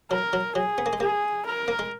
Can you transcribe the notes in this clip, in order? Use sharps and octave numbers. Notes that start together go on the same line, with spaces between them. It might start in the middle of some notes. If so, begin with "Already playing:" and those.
F#3 A#4
F#3
F#3 G#4
B3
A#3
G#3
A#3 G#4
A#4
A#3
G#3